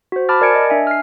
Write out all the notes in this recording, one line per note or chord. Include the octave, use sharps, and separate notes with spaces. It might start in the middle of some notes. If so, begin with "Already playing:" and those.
F#4 C5
A5 B5 D6 F6 A6
A#4 D5 G#5 G#6 C#7 D7
D#5
D4 E5 G#5
F6 C7